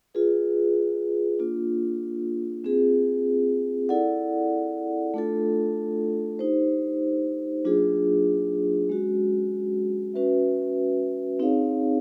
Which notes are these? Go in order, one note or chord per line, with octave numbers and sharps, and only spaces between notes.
F4 G#4 B4
A#3 D4 F4
C4 F4 G#4
E4 A4 D5 F#5
A3 D4 F4 A4
D#4 G4 C5
F#3 A#3 D4 F4 G#4
G#3 C#4 F#4
C#4 F#4 B4 E5
C4 D#4 G#4 C#5 F5